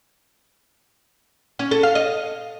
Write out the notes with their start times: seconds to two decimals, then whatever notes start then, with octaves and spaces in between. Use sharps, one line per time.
1.59 C#4
1.71 A4
1.83 F5
1.95 D#5